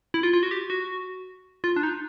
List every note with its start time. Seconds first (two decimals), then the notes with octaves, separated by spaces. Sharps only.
0.14 E4
0.23 F4
0.33 F4
0.43 F#4
0.51 G4
0.70 F#4
1.64 F4
1.76 D4
1.83 D#4